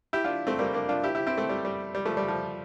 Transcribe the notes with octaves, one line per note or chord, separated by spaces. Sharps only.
E4 G4
D4 F4
A3 C4
G3 A#3
A#3 D4
D4 F4
E4 G4
E4 G4
C4 E4
A3 C4
G3
G3
G3
F3 A3
G3
F3